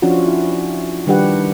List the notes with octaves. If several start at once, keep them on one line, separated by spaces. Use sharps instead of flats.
F3 C#4 D4 F4 F#4
E4
D#3 G3 D4 G4 B4 F#5